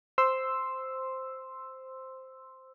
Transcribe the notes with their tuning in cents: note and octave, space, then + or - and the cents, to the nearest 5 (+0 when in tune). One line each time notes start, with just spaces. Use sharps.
C5 +0 C6 +0 E6 +0